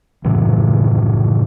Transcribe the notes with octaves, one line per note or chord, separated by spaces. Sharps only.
F#2 A2 C#3 E3